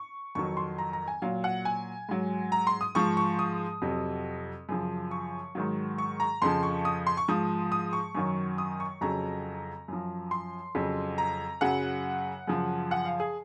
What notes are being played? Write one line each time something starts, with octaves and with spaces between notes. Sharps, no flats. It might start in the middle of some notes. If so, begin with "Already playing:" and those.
Already playing: C#6
F2 D#3 F#3 C#6
C6
A#5
A#5
G#5
A#2 F#3 F5
F#5
G#5
G#2 F#3
A#5
C6
D#6
G#2 F3 C#6
C#6
D#6
F2 C3 F#3
F#2 C#3 F3
C#6
G#2 D#3 F#3
C#6
A#5
F2 C#3 F3 C6
C#6
D#6
C6
C#6
G#2 F3 D#6
D#6
C#6
F#2 D#3 F#3
D#6
C#6
F2 C#3 F#3 A#5
F#2 F3
C6
F2 C#3 F#3
A#5
F#2 C#3 F#3 F#5
F#2 C#3 F3
F#5
F5
G#4